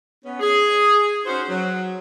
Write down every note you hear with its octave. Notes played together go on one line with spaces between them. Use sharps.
B3 C#4
G#4
C#4 D#4 F#4 C5
F#3